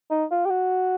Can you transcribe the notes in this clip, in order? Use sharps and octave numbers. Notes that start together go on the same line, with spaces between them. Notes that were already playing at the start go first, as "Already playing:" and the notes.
D#4
F4
G4
F#4